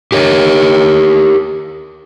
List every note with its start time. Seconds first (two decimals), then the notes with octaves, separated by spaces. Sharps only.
0.12 G4 A#4 C#5